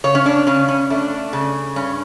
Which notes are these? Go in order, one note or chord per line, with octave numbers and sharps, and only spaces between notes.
C#3 C#5
C#4
D4
C#3 C#4
C#4
A3 D4
C#3
G2 C#4